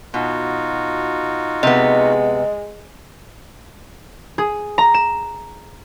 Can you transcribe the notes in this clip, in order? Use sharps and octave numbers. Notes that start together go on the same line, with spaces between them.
B2 D#4 F4 F#4
C3 G#3 B3 D#5
G#4
A#5
E7